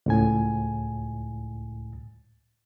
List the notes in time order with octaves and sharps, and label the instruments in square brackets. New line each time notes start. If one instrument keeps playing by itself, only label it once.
[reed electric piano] C#2 A2 G#5